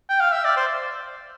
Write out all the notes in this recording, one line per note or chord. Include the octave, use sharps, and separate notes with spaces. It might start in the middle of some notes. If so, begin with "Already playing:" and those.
G5
F5
E5
D5
C5